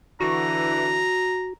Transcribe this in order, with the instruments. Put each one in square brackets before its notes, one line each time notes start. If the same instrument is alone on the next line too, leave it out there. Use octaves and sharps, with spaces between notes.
[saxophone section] D3 E3 [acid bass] F#4 [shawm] A#5